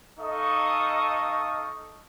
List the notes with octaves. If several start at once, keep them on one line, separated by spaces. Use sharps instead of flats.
D#4 A4 D#5 F5 C#6 D#6